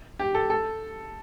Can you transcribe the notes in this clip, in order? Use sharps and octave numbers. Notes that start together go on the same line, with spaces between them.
G4
A4
A4